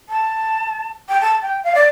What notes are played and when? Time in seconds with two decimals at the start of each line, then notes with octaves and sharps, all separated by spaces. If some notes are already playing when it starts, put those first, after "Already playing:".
0.09 A5
1.09 G5
1.21 A5
1.42 G5
1.64 F5
1.75 D5